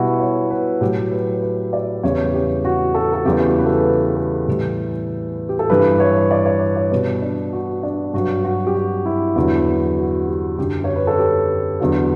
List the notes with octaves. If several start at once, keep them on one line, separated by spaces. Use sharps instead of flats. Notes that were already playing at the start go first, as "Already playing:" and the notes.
Already playing: B2 G3 E4 F#4
C#5
B4
A2 F#3 G4
B4
B4
D5
E2 C#3 E3 G3 C#5
G4
F#4
A4
A4
E2 C#3 E3 G3 G4
F#4
B4
A4
B4
A4
A2 E3 G3
G4
A4
G2 E3 G3 B4
C#5
D5
C#5
C#5
B2 G3 B4
D4
F#4
D4
G2 F#3 F#4
F#4
G4
F#4
E4
E2 D3 F#3
F#4
G4
F#2 D3 G3 G4
C#5
B4
A4
G4
E2 D3 F#3